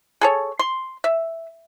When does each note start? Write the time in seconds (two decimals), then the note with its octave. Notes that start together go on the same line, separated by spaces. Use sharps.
0.21 G#4 A4 C#5
0.59 C6
1.04 E5